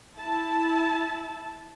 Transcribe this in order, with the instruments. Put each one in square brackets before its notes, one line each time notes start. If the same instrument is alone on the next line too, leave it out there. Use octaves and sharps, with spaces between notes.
[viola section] E4 A5